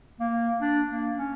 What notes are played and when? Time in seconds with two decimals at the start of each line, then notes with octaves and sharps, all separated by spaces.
0.20 A#3
0.61 D4
0.89 A#3
1.17 C#4